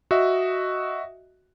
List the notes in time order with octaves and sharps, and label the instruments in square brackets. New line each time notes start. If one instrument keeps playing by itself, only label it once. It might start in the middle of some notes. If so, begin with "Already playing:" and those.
[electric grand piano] F#4 D#5 E5